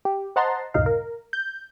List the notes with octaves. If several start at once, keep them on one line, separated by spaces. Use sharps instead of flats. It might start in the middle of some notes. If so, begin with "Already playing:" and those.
G4
C5 D#5 F#5 A5 A#5 C6
C#2 F#2 A2 C3 D#4 F5
A#4
G6